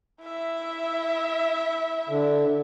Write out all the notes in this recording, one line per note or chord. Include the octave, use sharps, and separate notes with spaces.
E4 E5
D3